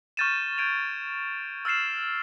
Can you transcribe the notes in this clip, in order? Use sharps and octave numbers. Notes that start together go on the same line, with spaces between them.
C#6 F6 G6 A6 D#7 E7
G6 G#6 D7 D#7 F7
E6 F6 A6 C7 E7